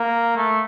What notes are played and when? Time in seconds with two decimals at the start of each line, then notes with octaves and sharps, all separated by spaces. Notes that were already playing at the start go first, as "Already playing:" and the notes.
Already playing: A#3
0.36 A3